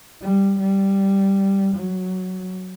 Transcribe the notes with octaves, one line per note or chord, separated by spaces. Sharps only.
G3
G3
F#3